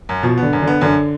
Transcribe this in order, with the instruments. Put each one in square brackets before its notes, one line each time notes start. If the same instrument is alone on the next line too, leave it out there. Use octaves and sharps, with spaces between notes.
[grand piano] F#2
[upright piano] B2 [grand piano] F3
[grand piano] B3
[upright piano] D3
[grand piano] F#2
[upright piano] D3
[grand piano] B3
[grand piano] F#2 [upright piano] D3